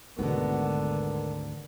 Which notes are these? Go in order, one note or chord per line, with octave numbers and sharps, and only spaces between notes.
G#1 D2 G#2 B2 D3 B3 A#4